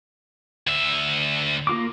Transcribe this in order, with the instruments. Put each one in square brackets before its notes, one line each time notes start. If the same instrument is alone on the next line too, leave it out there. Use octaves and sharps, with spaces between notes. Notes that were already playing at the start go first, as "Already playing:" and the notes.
[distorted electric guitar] D2 E5
[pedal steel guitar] A#3 F4 D6